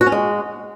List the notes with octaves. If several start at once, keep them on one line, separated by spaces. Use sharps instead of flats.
F#4
C#4
G#3